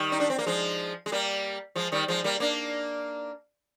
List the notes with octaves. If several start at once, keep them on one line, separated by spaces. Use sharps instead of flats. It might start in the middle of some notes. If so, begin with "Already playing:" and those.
Already playing: D#3 G3
D#4
D4
C4
A#3
F3 G#3
G#3
G3 A#3
F3 G#3
D#3 G3
F3 G#3
G3 A#3
A#3 D4